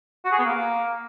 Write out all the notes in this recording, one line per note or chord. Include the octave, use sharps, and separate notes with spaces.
F#4
G#4
B3
A#3